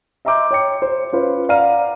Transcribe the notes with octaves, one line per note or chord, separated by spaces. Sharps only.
D#5 E5 A#5 C6 D6 G6
C#5 G5 C#7
C5
C#4 F4 B4 C5
D5 F5 F#5 A#5 F6 D#7